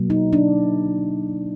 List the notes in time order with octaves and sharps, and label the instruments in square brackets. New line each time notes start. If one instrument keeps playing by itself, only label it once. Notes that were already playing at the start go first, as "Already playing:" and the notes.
Already playing: [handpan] B2 F#3 A#3
D#4
D4